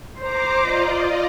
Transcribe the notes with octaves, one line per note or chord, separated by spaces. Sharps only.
C5 A#5 D6
F4 D5 D#5